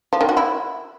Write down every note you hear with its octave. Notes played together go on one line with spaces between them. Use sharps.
F3
D#3
F#4
E4